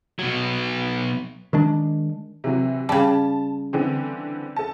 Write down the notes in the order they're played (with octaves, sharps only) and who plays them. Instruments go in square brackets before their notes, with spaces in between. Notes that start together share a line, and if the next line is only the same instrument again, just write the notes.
[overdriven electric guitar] B2 F#3
[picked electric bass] D#3 G#3 D4
[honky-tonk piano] C3 E3 F#3
[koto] C#3 G3 [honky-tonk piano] A5
[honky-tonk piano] D3 E3 C4
A4 A5